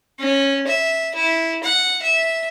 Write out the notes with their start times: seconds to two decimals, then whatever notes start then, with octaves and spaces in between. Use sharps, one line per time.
0.19 C#4
0.67 E5
1.15 E4
1.63 F#5
2.02 E5